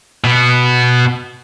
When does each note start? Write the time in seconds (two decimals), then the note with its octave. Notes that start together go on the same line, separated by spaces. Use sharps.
0.24 B2 B3